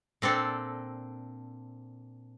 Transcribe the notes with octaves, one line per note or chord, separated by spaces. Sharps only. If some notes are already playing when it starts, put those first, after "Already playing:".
A#2 C4 D4 A4